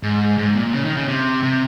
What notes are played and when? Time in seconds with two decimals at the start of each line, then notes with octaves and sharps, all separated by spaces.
0.03 G#2
0.38 G#2
0.55 A#2
0.73 C#3
0.84 D#3
0.97 C#3
1.08 C3
1.43 C3